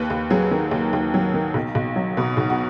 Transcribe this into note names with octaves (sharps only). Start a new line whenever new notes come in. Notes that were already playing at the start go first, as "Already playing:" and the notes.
Already playing: D#2 B4
D#2
F#3 G#4
D#3
D#2
D#2
F#3
D#3
B1
B1
F#3
B2
B1 D#4
F#4